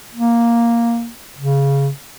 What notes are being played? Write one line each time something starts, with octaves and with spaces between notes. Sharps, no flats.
A#3
C#3